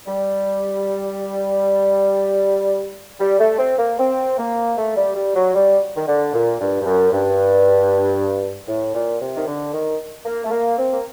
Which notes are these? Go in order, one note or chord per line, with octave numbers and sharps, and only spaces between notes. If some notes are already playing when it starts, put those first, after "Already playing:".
G3
G3
A3
C4
A#3
C4
A#3
A3
G3
G3
F#3
G3
D#3
D3
A#2
G2
G2
F#2
G2
A2
A#2
C3
D#3
D3
D#3
A#3
A3
A#3
C4
A#3